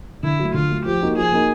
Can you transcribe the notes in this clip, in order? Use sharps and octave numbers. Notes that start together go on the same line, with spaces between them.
D3 E4
F#3 A3
D3 F4
F#3 A3
F3 G4
A#3 D#4 F#4
F3 G#4
A#3 D#4 F#4